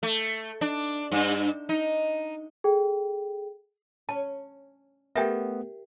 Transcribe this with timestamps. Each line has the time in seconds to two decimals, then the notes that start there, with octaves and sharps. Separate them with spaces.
0.03 A3
0.61 D4
1.12 G2
1.69 D#4
2.64 G#4 A4 G5
4.09 C#4 A5
5.16 A3 B3 G4 A#4 E5 G5